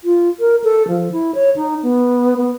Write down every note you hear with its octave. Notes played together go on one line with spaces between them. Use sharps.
F4
A#4
A4
F3
E4
C#5
D#4
B3
B3